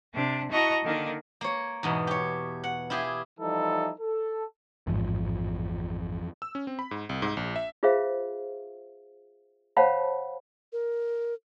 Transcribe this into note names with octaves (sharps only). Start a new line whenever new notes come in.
C3 D4
E4 F#4 D#5 A5 A#5 C#6
D3 D#3 A#3
A#3 C#5
E2 G#2 B2
G4 C#5
F#5
E4 F4 G4 G#4
E3 F3 G3 D#4 E4 A4
A4
A1 F2 G#2 E3 F3
E6
C#4
C4
B5
G#2
C2
G#2
A#1
E5
F4 G#4 B4 C5 E5 F5
C5 C#5 F5 F#5 A5 B5
A#4